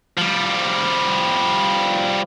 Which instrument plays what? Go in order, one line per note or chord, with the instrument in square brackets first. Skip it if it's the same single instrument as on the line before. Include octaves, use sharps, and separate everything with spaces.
[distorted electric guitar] F3 G3